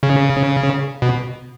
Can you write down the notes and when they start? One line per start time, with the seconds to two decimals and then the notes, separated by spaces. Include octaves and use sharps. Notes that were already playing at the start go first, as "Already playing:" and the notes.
0.03 C#3
1.02 B2